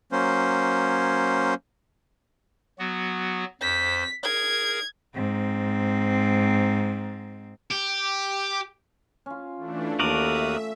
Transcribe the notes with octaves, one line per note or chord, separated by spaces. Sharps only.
F#3 A#3 C#4 C5
F#3 B3 F#4
F2 C5 B6
G#4 A#4 G#6
G#2 C4
G4
C#4 F4
E3 A3 D4
D#2 A3 F#4 A#4 D5 E5 D#6